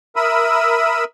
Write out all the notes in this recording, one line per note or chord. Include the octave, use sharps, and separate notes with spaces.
A#4 E5 B5 D#6 E6